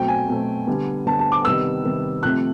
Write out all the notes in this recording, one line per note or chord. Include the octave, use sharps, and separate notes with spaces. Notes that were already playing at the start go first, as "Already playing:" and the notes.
Already playing: B2 F#3 A3 C4 G5
G#5
B2 F#3 A3 C4
D3 G3 B3
D3 G3 B3 A5
A5
D6
C3 D#3 G3 B3 E6
C3 D#3 G3 B3
C3 F3 A3 C4 F#6